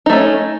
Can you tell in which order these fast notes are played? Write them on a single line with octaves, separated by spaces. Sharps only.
D#4 A3 C#4